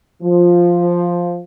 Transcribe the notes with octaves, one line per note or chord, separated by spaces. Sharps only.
F3